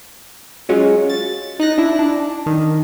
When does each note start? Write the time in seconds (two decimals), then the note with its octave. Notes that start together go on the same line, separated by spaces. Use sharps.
0.69 F#3 G#3 C#4 F4
1.10 A6
1.59 D#4 F#6 A#6
1.78 D4 E4
1.99 D4
2.46 D#3